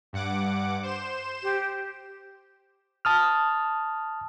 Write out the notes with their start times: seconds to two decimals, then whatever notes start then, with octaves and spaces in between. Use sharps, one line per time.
0.13 G2 F#5 D6
0.83 C5 E7
1.43 G4
3.05 A5 D#6 F6